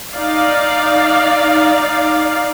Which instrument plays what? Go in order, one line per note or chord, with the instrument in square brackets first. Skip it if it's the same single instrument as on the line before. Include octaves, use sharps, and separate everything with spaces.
[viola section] D#4 D5 F5